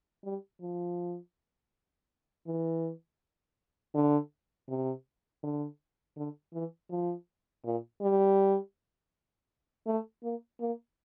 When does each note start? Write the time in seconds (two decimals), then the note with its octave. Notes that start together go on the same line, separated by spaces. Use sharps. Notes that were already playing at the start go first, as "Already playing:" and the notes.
0.24 G3
0.62 F3
2.47 E3
3.95 D3
4.69 C3
5.43 D3
6.17 D3
6.53 E3
6.90 F3
7.64 A#2
8.02 G3
9.87 A3
10.23 A#3
10.60 A#3